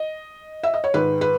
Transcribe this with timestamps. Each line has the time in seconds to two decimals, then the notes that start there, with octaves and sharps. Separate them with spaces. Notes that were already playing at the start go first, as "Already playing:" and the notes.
Already playing: D#5
0.63 E5
0.74 D#5
0.84 C#5
0.94 G#2 D#3 B4
1.21 B4